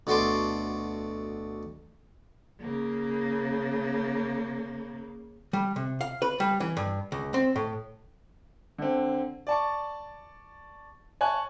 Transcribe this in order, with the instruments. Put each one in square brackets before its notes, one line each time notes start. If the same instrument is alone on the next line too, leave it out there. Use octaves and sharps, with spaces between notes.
[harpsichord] D2 B2 F#4 A4 C6 D6
[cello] C#3 A#3
[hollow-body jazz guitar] G3
C3
F5
B4
G3
E3
G2
C#2
C4
A2
[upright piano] D3 C4
D5 A5 C#6
C#5 G#5 A5 C#6 F#6